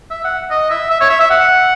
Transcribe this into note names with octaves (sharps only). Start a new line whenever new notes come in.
E5
F#5
D#5
E5
E5
C#5
E5
E5
F#5